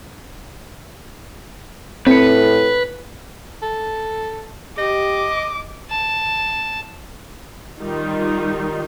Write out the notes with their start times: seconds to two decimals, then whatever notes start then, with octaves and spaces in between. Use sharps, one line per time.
2.07 A2 C4 B4 C#7
3.62 A4
4.78 G4 D#5 D6
5.90 A5
7.80 D#3 G3 D#4 F4